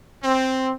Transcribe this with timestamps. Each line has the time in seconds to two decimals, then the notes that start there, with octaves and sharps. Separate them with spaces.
0.24 C4